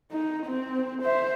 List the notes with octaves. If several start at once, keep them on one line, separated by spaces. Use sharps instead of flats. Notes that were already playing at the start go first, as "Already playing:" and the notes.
D#4
C4
C5 E5